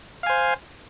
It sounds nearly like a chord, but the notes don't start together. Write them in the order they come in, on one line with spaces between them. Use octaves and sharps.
F5 G#5 C5